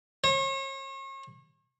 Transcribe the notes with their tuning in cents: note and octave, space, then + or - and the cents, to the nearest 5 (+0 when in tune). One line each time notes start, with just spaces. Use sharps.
C#5 -40